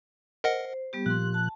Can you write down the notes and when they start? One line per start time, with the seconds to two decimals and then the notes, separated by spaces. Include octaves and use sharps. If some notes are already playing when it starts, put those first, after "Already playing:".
0.44 A#4 C5 D#5 F#5
0.93 G3 B3 G4
1.06 A#2 F3 G4 C6 F#6
1.34 A5